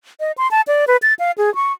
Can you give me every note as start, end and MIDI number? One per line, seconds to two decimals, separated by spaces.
0.20 0.32 75
0.38 0.50 84
0.51 0.61 81
0.68 0.85 74
0.87 0.97 71
1.02 1.14 93
1.19 1.31 77
1.38 1.53 68
1.55 1.72 85